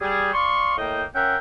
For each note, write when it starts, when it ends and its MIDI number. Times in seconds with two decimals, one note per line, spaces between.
0.01 0.31 55
0.01 0.31 68
0.33 0.76 74
0.33 0.76 77
0.33 0.76 84
0.33 0.76 85
0.77 1.03 45
0.77 1.03 58
0.77 1.03 75
0.77 1.03 79
1.15 1.37 61
1.15 1.37 70
1.15 1.37 76
1.15 1.37 78
1.15 1.37 79